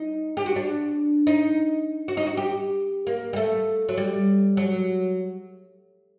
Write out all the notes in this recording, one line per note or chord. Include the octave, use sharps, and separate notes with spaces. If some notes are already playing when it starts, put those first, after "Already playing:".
Already playing: D#4
G4
F#4
D4
D#4
F#4
D#4
F#4
G4
A#3
G3
A3
F#3
G3
F#3